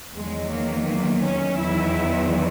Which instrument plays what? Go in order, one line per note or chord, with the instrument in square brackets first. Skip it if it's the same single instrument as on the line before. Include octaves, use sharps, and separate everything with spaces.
[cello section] E2 D#3 F#3 G#3
A#3
A#3
C#4
E2 D#3 F#3 E4